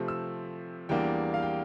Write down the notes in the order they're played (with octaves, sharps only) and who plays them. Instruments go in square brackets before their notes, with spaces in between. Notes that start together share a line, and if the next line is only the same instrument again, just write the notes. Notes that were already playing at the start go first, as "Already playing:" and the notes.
Already playing: [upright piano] C3 F3 A3 C4
E6
E2 E3 G3 A#3 D4 G5
F5
G5